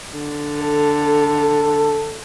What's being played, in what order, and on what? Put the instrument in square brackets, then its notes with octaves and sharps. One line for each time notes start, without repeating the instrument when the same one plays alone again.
[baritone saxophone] D3
[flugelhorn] A4